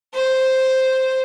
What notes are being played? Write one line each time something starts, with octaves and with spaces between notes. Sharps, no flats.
C5